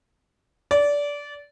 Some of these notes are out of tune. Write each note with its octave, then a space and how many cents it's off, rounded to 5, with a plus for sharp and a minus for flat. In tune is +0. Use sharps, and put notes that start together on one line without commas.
D5 -20